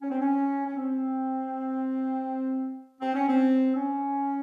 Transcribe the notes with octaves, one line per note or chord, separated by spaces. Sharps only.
C#4
C4
C#4
C#4
C4
C4
C#4
C4
C#4